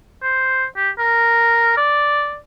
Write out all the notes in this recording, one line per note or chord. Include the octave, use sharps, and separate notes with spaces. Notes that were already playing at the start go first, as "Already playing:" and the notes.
C5
G4
A#4
D5